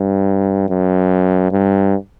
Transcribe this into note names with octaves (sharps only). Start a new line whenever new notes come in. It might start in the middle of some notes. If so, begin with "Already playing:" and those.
Already playing: G2
F#2
G2